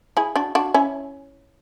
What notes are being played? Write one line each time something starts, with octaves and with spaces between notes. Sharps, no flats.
E4 G#4
D4 F#4
D4 F#4
C#4 E4